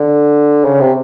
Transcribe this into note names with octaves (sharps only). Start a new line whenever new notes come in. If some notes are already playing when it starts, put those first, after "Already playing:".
Already playing: D3
C#3
C3